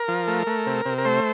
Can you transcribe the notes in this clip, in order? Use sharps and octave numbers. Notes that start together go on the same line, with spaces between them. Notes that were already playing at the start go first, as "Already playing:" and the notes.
Already playing: A#4
F3
A3
A3
C3
C3
A#4
A3 C5